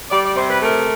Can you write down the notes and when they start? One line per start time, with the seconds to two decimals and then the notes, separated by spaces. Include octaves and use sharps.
0.11 G3 D5
0.23 D5
0.36 C3 C5
0.49 B4
0.62 A3 A#4